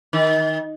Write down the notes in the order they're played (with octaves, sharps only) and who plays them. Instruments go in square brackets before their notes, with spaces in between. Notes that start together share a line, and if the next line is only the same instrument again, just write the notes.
[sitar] D#3